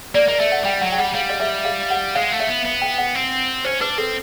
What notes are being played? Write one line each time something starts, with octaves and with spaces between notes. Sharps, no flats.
A#3 D5
A#3 D#5
A3 E5
F#5
G3 G5
F#3 F#5
G5
G3 F#5
G3 F5
D#5
E5
F5
F#5
G#3 F5
A3
E5
B3
B3
G5
F#5
C4
C#4 C5
D4 B4
C4 A4